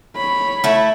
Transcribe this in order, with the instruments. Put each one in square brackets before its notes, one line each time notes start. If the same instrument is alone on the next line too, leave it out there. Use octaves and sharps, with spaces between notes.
[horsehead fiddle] C#5 B5
[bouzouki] A3 E4